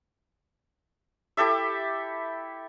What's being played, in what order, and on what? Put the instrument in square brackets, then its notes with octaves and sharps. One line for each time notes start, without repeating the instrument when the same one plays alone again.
[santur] E4 G4 A4 E5